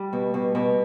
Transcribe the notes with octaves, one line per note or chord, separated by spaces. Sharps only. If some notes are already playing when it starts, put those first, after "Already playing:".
Already playing: G3
B2
B2
B2